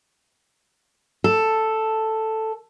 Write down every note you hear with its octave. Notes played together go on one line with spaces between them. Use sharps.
A4